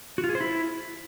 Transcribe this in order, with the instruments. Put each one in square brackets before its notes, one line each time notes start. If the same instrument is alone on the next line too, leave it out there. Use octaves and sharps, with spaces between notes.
[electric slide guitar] F#4
F4
G#4
C5
E4